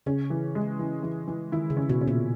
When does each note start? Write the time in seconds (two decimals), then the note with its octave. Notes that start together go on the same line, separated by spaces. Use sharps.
0.06 C#3 C#4
0.30 E3
0.55 G#3
0.79 E3
1.03 E3
1.28 E3
1.52 D#3 E4
1.70 C#3
1.77 C#4
1.89 B2
2.01 C#4
2.08 A#2